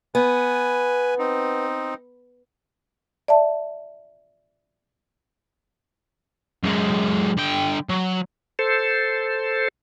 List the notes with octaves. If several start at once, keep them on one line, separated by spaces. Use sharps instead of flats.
B3 B4 G#5
C4 D#4
D5 E5 A5
F#2 G#3
D3 G5
F#3
A4 C5